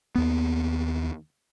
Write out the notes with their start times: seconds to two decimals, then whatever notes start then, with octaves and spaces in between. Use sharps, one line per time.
0.15 D#2 B3